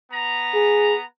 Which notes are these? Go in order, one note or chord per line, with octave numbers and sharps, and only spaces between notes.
B3 A#5
G#4